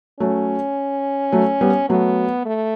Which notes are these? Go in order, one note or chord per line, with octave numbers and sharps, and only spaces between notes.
F#3 A3 C#4
F#3 A3
G3 B3
F#3 A3 B3
A3